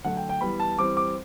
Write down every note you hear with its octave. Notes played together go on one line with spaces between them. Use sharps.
D3 F#3 A3 F#5
G5
G5
E3 G3 B3 B5
A5
E3 G3 C4 D6
D6